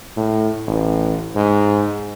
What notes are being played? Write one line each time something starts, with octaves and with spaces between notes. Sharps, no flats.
A2
A1
G#2